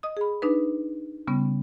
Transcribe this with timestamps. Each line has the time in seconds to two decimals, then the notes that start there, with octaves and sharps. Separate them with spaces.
0.03 D#5 D#6
0.17 G#4 B5
0.42 D4 D#4 B4
1.27 C#3 G3 B3 C#4